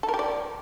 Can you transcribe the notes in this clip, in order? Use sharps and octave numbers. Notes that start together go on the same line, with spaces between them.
A4
A#4
G4
D5